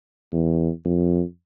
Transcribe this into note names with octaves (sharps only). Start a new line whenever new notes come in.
E2
F2